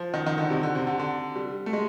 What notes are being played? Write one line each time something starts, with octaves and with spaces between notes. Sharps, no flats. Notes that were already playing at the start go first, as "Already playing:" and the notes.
Already playing: F3
D#3
D#3
D3
C3
D3
C3
D3
D3
G3
A3
G#3